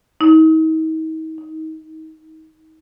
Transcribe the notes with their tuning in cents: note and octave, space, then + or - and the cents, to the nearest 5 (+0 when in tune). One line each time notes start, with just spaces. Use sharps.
D#4 +40
D#4 +25